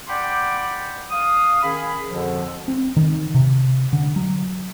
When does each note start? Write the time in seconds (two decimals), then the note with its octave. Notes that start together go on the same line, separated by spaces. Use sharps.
0.07 D5 F#5 G5 B5 C6 D6
1.10 F5 D#6
1.63 D#3 C#4 G#4 B5
2.09 F2 B2 D3 F3
2.68 C4
2.97 D#3
3.34 C3
3.93 D3
4.16 F#3